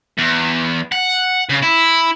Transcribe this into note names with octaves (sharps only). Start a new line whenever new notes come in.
E2
F#5
C#3
E4